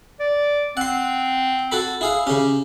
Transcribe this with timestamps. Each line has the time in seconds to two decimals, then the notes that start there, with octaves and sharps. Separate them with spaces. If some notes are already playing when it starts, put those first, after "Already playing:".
0.20 D5
0.77 C4 F#5 C6
1.72 F#4 A4 B5
2.01 E4 G#4 F5
2.27 C#3 C#4 G4